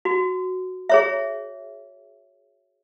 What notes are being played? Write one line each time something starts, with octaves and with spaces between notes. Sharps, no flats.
F#4
G#4 C#5 E5